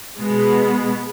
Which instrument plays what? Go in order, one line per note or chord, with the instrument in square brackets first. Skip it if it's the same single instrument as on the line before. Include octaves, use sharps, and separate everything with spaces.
[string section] B2 G#3 B3